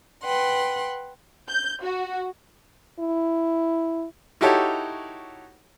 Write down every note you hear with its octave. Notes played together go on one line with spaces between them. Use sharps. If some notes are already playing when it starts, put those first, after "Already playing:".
B4 F#5 G5 C6
G6
F#4
E4
D#4 E4 F#4 G4 A4 C#5